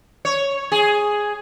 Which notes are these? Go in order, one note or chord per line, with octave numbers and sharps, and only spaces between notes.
C#5
G#4